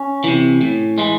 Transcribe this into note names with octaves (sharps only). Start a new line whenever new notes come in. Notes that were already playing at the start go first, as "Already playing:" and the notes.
Already playing: C#4
C3 E3
A2
E3 G#3